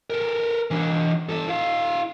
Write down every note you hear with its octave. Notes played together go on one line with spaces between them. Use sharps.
A4 A#4
E3 D4
G3 A4
E4 F5